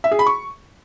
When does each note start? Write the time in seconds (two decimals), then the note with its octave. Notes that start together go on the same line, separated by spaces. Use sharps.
0.04 E5
0.12 G#4
0.19 B5
0.27 C#6